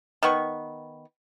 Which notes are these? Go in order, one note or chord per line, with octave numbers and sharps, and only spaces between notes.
D#3 B3 C#6